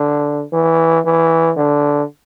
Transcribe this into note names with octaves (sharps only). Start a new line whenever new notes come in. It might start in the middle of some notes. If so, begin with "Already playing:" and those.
Already playing: D3
E3
E3
D3